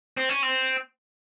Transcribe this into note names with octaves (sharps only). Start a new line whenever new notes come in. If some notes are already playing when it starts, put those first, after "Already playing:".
C4
C#4
C4